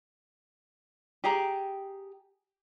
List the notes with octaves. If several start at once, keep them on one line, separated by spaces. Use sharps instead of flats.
G4 G#4 G5 A#5